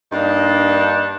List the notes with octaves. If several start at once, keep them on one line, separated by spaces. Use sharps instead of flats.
G2 A#3 D4 D#4